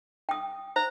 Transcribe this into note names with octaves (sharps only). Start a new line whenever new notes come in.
G5 D#6
C5 A#5